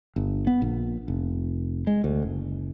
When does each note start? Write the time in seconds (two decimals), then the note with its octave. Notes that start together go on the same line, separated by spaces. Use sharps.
0.16 G1
0.47 B3
0.62 A#1
1.08 F1
1.87 G#3
2.04 D2
2.23 F#1